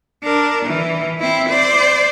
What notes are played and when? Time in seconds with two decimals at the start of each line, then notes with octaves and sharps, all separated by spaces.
0.23 D4 A#4
0.65 E3
1.20 C4 E4
1.49 C5 D5